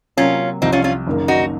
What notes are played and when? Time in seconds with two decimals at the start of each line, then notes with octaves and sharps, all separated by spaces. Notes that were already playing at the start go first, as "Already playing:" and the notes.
0.17 C3 F#3 A#3 C#4 F4
0.62 C2 C3 F3 C4 D#4
0.72 C#4 F4
0.84 C#4 F4
1.07 F#1 F#2 D#3 A#3
1.28 D#4 F#4